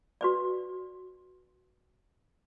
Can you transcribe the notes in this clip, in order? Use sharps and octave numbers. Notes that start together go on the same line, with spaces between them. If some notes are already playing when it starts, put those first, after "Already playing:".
F#4 B4 D5